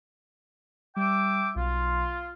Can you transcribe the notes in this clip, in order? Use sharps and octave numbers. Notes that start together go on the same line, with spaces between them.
G3 E5 G5 D6
B1 F4